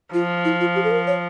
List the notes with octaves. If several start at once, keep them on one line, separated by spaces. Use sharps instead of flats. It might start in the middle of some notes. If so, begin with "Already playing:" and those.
F3 F4
E4
F4
G4
A4
A#4
C#5